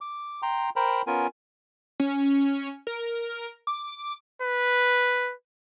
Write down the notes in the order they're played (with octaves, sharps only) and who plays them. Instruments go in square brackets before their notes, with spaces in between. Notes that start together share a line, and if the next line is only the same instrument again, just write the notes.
[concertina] D6
G5 A#5 C6
A#4 C5 G5 A#5 B5
B3 C#4 F4 A#4 G#5
[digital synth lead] C#4
A#4
D6
[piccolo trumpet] B4